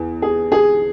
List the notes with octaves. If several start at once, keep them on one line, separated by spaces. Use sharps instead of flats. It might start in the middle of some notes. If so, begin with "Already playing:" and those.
Already playing: E2
G#4
G#4